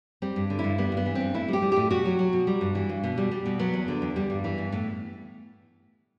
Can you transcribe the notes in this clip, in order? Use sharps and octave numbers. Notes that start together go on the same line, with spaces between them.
G3 C4
G2
D3
E4
G2
G3 B3
G2
B3
E3
C4
G2
A2 E4
G3
G4
G3
A2 G4
B2 F#4
F#3
F#3
B2
G3
G2
E3
G2
B2
G3
G3
B2
F#3 B3
E2
D3
E2
G3
G2
E3
G2
A2